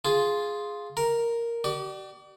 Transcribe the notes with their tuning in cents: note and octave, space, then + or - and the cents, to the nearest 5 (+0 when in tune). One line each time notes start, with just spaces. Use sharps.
F4 +0 G#4 +0
A#4 +0 A#5 +0
G4 -45 D5 +25